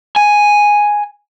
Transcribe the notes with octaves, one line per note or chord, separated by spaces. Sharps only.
G#5